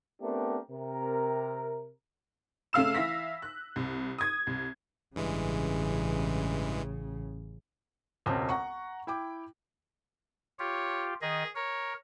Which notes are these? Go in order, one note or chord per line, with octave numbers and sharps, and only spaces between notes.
A3 B3 C4 D4 G4 A#4
C3 A#4
C#3 A3 F5 E6 E7
E3 E5 F5 A#6 B6
F#6
C2
D#6 G#6
C2
A1 G2 C#3 E3 G#3
E1 C#2 C4 C#4 A5
F#5 A#5 C#6
E4 G5 D6
F4 G4 C#5
D#3 G#4 D#5
A#4 C#5